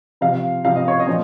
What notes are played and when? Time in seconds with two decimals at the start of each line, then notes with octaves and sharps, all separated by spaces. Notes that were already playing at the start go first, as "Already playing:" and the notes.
0.21 C3 F3 F5
0.65 C3 F3 F5
0.76 D#5
0.88 C#5
1.00 D#5
1.07 A#2 F3